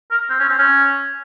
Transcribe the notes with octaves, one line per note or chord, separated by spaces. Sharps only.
A#4
C4
C#4
C4
C#4